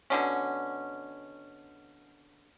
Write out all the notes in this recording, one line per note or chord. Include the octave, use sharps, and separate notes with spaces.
B2 D3 C#4